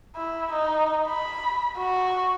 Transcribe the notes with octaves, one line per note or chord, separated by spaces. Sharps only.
E4
D#4
B5
F#4